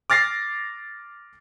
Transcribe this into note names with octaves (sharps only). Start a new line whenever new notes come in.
D6 F6 A6 A#6 C7